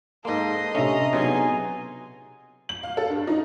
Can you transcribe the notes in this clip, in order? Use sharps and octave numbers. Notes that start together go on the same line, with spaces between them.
G#2 A#3 A4 D#5 C6
C3 A3 C#4 D4 E5 A#5
B2 F#3 D#4 G#4 G#5 C6
F#7
F5
A4
G2
D#4